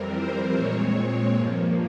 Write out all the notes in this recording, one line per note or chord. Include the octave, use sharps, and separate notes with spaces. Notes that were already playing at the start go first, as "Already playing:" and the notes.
Already playing: F2 E3 G3 C4 A#4
C5
A#2 G#3 C4 C#5
G2 F3 A#3